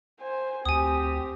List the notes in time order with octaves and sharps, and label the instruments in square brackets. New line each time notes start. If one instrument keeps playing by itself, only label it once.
[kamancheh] C5 G#5
[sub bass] D2 [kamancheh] C4 G4 [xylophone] G#5 D#6